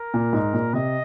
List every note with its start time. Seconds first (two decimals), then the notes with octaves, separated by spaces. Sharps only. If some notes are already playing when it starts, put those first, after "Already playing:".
Already playing: A#4
0.14 A#2
0.33 G#2
0.54 A#2
0.73 C3 D#5